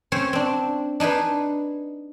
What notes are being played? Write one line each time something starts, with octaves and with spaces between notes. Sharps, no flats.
C4 C#4 C5 C#5
C4 D4
D4 D#4 G#4 B4